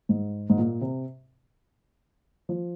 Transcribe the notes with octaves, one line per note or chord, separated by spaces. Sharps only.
G#2
G#2
A#2
C3
F3